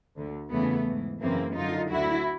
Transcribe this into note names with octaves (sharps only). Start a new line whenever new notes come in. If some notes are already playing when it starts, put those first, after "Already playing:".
D2 D3
E2 C#3 E3 A3 B3
G#2 E3
F#2 C#3 E3 A#3 C4
F#2 D3 D#4 F4
D2 D3 E4 F#4